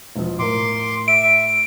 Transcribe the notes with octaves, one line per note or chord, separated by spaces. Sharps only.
E1 F3
A2 A#4 C6 D6
E5 D7